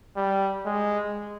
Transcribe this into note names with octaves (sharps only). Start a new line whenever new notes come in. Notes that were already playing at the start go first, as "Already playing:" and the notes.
G3
G#3